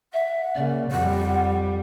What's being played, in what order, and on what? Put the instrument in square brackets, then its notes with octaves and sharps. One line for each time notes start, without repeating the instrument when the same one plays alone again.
[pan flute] E5 [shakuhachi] F#5
[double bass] C#3 A#3 [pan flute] D5
[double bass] F2 G3 [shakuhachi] F#5